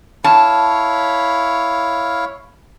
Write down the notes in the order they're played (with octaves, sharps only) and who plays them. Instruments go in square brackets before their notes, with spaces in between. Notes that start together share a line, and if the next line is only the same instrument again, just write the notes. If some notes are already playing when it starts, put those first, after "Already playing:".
[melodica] E4 C#5 F5 [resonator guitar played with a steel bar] A5